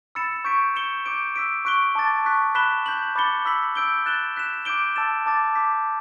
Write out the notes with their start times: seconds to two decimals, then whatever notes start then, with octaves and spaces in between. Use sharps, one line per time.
0.15 B5 E6 A6 C#7 E7
0.44 C#6 G6 B6 D7
0.75 G6 C#7 E7 G7
1.06 D6 G6 D7
1.36 E6 B6 D7
1.65 C#6 F#6 B6 D7 G7
1.95 A5 D6 A6
2.25 C#6 F#6 B6
2.55 B5 F#6 B6 E7 G7
2.86 G6 B6 F#7
3.16 B5 D6 A6 C#7 G7
3.45 B5 E6 B6 F#7
3.75 E6 G6 D7 G7
4.06 F#6 A6 E7 G7
4.36 F#6 B6 E7
4.65 D6 G6 D7 G7
4.96 A5 E6 A6 E7
5.26 A5 D6 A6
5.55 D6 G6 B6